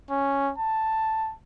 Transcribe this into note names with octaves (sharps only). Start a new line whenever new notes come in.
C#4
A5